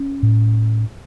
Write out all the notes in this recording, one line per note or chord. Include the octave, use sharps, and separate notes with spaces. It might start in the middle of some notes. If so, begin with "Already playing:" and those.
Already playing: C#4
A2